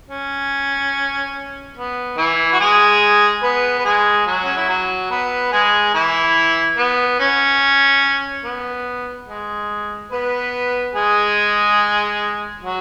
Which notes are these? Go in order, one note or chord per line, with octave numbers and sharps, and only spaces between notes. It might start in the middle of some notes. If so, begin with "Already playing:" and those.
C#4
B3
E3 E4
F#4
G#3 G#4
B3 B4
B4
G#3 G#4
F#3 F#4
C#4
E4
F#3 F#4
B3 B4
G#3 G#4
E3 E4
B3
C#4
B3
G#3
B3 B4
G#3 G#4
F#3 F#4